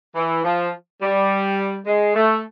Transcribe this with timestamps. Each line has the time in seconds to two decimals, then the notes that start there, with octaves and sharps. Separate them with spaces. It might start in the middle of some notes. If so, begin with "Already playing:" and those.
0.16 E3
0.44 F3
1.02 G3
1.86 G#3
2.15 A3